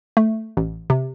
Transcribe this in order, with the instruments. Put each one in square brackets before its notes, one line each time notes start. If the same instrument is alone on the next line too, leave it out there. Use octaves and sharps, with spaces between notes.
[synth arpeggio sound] A3
A1
C3